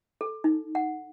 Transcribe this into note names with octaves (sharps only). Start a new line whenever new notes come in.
A4
D#4
F#5